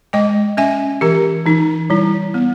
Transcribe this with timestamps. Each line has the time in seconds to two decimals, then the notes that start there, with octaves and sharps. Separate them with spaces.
0.13 G#3 D#5 G5
0.57 C#4 E5 G#5
1.01 E3 G4 A#4
1.46 E3 D#4
1.90 G3 E4
2.34 B3